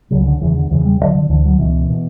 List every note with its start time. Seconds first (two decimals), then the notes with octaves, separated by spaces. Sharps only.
0.11 C#2 C#3 F#3
0.25 D3
0.41 E2 C#3 E3
0.56 D3
0.71 E2 C#3 E3
0.85 G3
1.00 D2 F#3
1.04 D3
1.15 D3
1.29 D2 D3 E3
1.45 F#3
1.59 C#2 B2 E3
1.90 B2